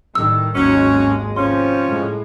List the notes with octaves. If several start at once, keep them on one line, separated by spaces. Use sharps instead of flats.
A2 D#3 G3 E6
G#1 D#2 F#3 G#3 C#4
C3 F3 C#4 C6
A2 G#3